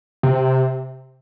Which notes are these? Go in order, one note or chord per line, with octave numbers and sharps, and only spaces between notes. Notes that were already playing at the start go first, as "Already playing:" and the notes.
C3